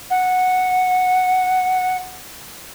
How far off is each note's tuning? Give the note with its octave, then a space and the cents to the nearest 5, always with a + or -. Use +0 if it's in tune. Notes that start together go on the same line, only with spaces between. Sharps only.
F#5 -5